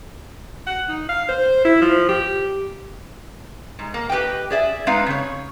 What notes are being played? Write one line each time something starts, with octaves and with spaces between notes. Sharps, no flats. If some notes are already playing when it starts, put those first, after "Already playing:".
F#5
D#4
F5
C5
E4
F3
G4
G#2
A#3
G4 B4 D#5 G5
G#4 D5 E5
G#3 C4 D#4 B4 F5
C#3 C#5